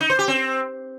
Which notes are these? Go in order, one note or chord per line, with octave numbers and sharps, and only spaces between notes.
D#4
C5
G4
C4